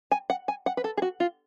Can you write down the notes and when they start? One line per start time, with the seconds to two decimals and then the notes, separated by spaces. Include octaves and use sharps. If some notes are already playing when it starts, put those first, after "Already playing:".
0.12 G#5
0.30 F#5
0.48 G#5
0.66 F#5
0.77 B4
0.84 A4
0.97 G#4
1.02 F#4
1.20 F4